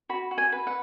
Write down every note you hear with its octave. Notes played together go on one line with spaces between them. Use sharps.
F#4 B5
F#4
G#5
B4
F#5